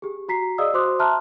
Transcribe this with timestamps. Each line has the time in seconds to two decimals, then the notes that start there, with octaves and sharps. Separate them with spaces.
0.02 G4 G#4
0.29 F#4 A#5 B6 C7
0.58 G#4 D5 D#5 F5 D#6 E6
0.74 F#4 C5 C6 D6 D#6 F#6
0.99 E5 A5 A#5 C6 F6 F#6